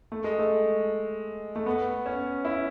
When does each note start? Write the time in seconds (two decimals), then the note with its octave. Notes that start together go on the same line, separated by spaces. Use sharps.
0.12 A3
0.24 G#3
0.39 A3
1.56 A3
1.66 B3
2.06 C#4
2.45 E4